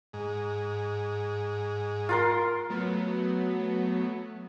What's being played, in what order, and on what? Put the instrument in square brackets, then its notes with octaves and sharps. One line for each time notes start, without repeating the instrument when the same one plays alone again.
[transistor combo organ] G#2
[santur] F4 A#4 C6
[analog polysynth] F#3 A3 B3